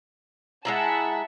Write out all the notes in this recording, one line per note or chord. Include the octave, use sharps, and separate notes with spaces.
G#3 E4 E5 F#5 A5 A#5